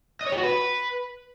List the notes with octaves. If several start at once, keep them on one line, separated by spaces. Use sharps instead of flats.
D#5
C#5
G4
F#4
B4